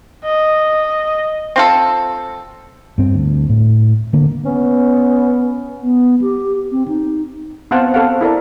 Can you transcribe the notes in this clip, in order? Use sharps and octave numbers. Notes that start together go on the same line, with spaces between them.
D#5
C4 F4 A4
G2 C4
D2
A2
D3 A#3
B3 C#4
B3
G4
C4
D#4
B3 C4 C5 F5 F#5 A5
C4 A4 F5 F#5
E4 A4 A#4 D5